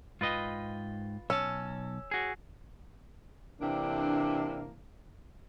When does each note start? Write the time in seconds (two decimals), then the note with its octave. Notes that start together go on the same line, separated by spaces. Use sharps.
0.21 G#2 F4 B4 D#5 G5
1.30 B1 C#4 A5 E6
2.11 F#4 G#4
3.61 C3 E3 A#3 D4